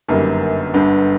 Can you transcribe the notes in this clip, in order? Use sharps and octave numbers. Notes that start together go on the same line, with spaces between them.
G1 F#2 D#3 G3 A#3
G1 G2 D3